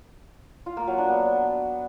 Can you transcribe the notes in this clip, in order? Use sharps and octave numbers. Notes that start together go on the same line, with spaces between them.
F4
A#3
F#3
D4
B3